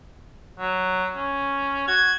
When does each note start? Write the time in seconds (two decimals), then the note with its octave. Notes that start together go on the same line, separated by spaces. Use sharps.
0.60 F#3
1.15 C#4
1.88 F#4 G#6